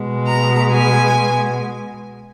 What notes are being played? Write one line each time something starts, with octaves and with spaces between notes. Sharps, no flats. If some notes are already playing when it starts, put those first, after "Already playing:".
Already playing: B2 G#3
A#5
G#5